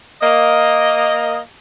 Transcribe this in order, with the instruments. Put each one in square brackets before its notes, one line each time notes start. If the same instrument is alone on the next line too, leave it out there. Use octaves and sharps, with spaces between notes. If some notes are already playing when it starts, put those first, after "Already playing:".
[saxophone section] A#3 D#5